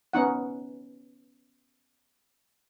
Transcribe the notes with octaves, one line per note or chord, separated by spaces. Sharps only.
B3 C#4 D#4 F#5